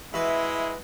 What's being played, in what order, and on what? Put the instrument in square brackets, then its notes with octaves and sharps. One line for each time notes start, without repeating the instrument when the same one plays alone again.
[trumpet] G#3 [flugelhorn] E4 [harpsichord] F#4 B4 [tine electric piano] E5